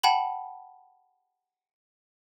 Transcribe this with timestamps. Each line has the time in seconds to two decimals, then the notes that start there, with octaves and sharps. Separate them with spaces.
0.03 F#5 G5 A5 B5 F#7